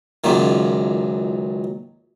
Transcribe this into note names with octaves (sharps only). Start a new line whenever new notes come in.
C#2 F#2 A#2 D#3